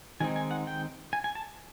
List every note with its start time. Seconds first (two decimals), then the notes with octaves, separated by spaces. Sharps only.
0.20 D#3 G#3 C4 D#4 G#5
0.36 G#5
0.51 F#5
0.67 G5
1.13 G#5
1.24 G#5
1.35 A5